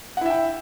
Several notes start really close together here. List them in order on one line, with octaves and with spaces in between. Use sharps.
F#5 E4 E5 G5